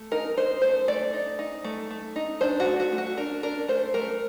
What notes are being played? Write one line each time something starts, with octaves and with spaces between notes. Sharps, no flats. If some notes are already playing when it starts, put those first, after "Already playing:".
Already playing: A3
D#4 A#4
D#4 C5
A3 C5
A3 D5
D#4
D#4
A3
A3
D#4
D4 C5
F#4
A3
F#4
A3
F#4
D4 A#4
D4 A#4
A3 C5
A3 A#4